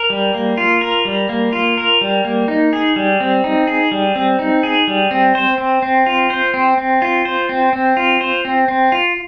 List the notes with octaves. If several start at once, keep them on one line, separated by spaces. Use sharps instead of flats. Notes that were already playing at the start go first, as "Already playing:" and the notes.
Already playing: A#4
G3
A#3
F4
A#4
G3
A#3
F4
A#4
G3
A#3
D#4
G#4
G3
C4
D#4
G#4
G3
C4
D#4
G#4
G3
C4
C5
C4
C4
F4
C5
C4
C4
F4
C5
C4
C4
F4
C5
C4
C4
F4